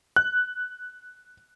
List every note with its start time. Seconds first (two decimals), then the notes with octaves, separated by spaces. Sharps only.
0.16 F#6